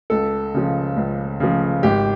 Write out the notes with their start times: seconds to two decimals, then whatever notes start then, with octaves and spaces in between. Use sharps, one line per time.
0.10 C#2 A4
0.54 C#3 F3
0.96 C#2
1.40 C#3 F3
1.83 G#1 G4